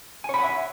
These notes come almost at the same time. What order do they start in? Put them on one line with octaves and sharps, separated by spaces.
G#5 C#5 B5 F#5 E5